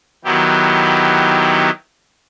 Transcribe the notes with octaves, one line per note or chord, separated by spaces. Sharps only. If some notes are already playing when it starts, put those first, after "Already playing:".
D#3 F#3 B3 E4 G4